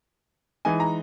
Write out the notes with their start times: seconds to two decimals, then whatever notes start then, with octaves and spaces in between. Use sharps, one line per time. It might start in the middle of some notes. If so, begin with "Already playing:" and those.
0.65 E3 G#3 D#4 G#5
0.80 A#5